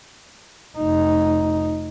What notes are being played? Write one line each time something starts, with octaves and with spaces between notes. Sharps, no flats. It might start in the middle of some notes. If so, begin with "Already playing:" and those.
F1 D#4